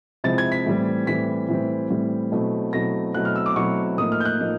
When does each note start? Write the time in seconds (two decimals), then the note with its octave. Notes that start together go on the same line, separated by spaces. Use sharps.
0.24 C3 F3 G#3 C4 E4 A6
0.38 G#6
0.52 B6
0.66 A2 E3 G3 C4
1.07 A2 E3 G3 C4 B6
1.49 A2 E3 G3 C4
1.90 A2 E3 G3 C4
2.32 B2 F#3 A3 C4 E4
2.73 B2 F#3 A3 C4 E4 A#6
3.15 B2 F#3 A3 C4 E4 F#6
3.25 F6
3.36 E6
3.46 D6
3.56 B2 F#3 A3 C4 E4 C#6
3.98 A2 F3 A#3 D#4 D#6
4.12 F6
4.20 G6
4.25 F#6
4.40 A2 F3 A#3 D#4